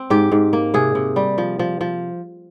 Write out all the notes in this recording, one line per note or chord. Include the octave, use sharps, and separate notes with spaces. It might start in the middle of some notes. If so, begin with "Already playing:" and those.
Already playing: C4
G#2 G4
G#2
A#3
C3 G#4
C3
G3
F3
F3
F3